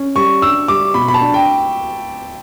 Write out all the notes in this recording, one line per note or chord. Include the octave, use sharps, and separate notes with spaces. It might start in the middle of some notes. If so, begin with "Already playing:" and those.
Already playing: C#4
G3 C#6
D4 E6
G3 D6
B2 B5
B5
A5
D4
G5